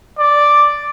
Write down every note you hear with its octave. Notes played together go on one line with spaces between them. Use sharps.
D5